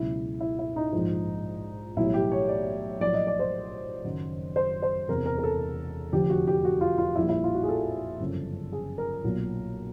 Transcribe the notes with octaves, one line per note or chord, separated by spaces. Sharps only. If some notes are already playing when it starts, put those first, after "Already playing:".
Already playing: C#2 B2 F#3 E4
E4
E4
D#4
A#1 G#2 F3
B1 A2 E3 G3 E4
G4
C#5
D5
A#1 A2 F#3 D5
D#5
D5
C5
F#1 F#2 D#3 F#3
C5
C5
E1 E2 C3 A#4
A#4
A#4
A4
F1 F2 D3 G4
F#4
G4
F#4
F4
F4
A#1 A#2 G3 E4
E4
F4
F#4
G#4
A4
G1 F#2 C#3 F3
G#4
A#4
B1 A#2 F#3